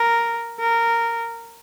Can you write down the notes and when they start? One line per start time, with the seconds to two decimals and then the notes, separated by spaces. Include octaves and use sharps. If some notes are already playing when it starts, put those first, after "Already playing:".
Already playing: A#4
0.59 A#4